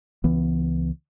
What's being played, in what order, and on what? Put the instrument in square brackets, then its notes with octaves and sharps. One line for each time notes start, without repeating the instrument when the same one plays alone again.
[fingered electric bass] C#2 E3 B3